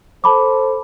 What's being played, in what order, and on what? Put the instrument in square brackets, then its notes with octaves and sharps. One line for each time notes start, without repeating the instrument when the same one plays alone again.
[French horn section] A4 C5 [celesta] A5 B5 D6